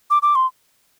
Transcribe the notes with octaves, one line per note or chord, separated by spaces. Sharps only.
D6
D6
C6